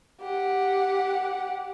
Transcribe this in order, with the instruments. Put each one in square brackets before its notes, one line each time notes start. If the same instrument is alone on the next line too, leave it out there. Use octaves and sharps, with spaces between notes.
[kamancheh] G4 F#5